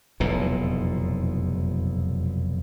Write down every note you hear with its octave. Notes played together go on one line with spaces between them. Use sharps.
F1 B1 E2 A#2